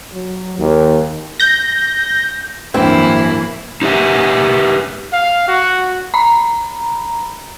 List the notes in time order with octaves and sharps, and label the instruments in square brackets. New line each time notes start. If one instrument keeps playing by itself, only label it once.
[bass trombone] F#3
D#2
[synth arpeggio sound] G6 A#6
[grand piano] D1 G2 [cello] E3 A#3 [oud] C4 [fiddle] E4
[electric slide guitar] D#4 G4 B4 E5
[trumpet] F5
F#4
[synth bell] A#5 B5